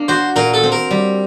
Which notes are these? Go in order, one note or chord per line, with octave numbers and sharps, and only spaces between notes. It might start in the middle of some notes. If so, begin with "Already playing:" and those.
Already playing: A#3 D4
F#4 C5
A#2 A#4
A4
C4
A#4
G3